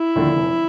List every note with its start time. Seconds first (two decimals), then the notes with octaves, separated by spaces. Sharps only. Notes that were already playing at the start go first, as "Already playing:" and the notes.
Already playing: E4
0.15 D#2 D3 F3
0.36 F1